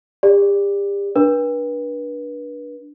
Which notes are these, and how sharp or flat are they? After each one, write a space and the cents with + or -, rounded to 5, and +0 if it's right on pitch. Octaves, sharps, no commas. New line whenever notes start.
G4 +35 D5 +0
D4 +0 B4 -35